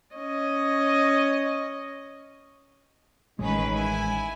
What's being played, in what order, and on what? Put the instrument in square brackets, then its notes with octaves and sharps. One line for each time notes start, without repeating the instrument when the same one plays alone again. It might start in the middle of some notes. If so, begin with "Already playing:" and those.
[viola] C#4 D#5
[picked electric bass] A1 G#3 [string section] D#3 C#4 B4
[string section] E4 G#5